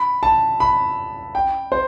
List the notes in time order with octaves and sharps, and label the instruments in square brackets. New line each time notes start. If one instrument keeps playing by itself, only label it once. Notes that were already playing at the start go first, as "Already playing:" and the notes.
Already playing: [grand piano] B5
A5
B5
G5
C5